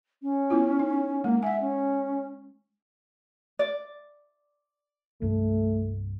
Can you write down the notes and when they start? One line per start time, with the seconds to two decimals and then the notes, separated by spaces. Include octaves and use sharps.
0.22 C#4
0.50 B3 E4 F4
0.79 D#4
1.24 G#3 A#3
1.43 E5 F#5 G#5
1.61 C#4
3.59 D5
5.22 C2 G2 A3